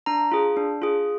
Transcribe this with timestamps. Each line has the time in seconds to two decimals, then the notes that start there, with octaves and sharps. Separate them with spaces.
0.06 D4 A#5
0.32 F4 G#4
0.57 D4
0.82 F4 G#4